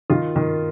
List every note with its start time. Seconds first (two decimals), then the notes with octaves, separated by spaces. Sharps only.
0.10 D#3 F4
0.36 D#3